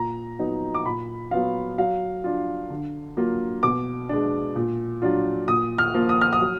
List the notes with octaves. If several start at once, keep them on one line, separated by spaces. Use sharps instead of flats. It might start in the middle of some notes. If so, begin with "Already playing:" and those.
Already playing: A#2 A#5
F#3 B3 D#4
D6
A#2 B5
F#3 B3 F4 F5
F#3 F5
D4 F4
D3
F#3 A#3 F4
B2 D6
G#3 D4
A#2
F#3 D4 F4
A#2 D#6
F6
F3 A#3 F4
D#6
F6
D#6
F#3